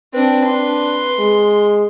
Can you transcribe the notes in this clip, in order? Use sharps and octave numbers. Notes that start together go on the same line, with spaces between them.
C4 D4 B4
D4 C6
G#3